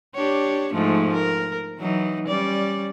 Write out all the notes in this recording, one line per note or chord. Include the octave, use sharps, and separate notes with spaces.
D4 G4 C#5
G#2 F3 A3
A#4
E3 F#3 D#4
G3 C#4 D5